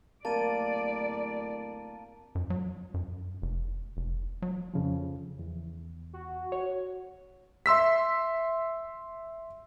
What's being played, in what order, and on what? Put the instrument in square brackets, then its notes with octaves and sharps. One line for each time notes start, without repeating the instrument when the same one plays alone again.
[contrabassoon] D1 [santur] A#3 [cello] D5 [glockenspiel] A5 A6 D#7
[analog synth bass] F#2
F#3
F#2
F1
F1
F#3
[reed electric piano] F2 C#3 F3
E2
[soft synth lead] F#4
[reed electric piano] C#5
[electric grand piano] E5 C6 E6 B6